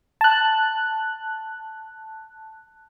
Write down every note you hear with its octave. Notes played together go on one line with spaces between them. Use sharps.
A5 F#6